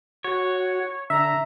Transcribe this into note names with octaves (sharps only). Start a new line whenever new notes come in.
F#4 C#5
D3 E5 A#5